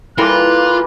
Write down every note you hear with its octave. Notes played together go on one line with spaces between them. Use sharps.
E3 G3 A#3 E4 F4 A4 A#4 F#6